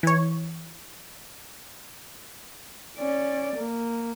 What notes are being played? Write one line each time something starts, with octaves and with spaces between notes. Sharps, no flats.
E3 C#5
C#4 D5
A#3